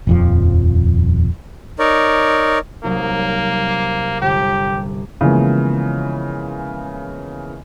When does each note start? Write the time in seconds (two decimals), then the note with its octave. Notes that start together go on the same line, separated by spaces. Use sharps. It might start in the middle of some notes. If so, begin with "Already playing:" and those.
0.07 D#1 F2 F3
1.79 D#4 A#4 C#5 D5
2.84 C2 F#3 A#3 D#4
4.22 G1 G4
5.21 C#3 E3 F3 G#3 A#3 B3